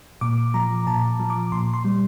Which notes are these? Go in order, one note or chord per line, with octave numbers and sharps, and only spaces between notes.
A#2 D6
F3 A#5
A#2 A5
F3
D6
A#2 C6
C6
G3